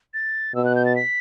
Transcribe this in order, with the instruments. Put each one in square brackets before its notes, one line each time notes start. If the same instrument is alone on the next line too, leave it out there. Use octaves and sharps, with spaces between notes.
[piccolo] A6
[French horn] B2 [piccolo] E6
[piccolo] F#6
G6
A6
B6